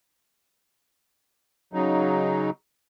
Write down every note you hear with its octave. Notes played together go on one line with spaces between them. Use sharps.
C#3 F#3 D#4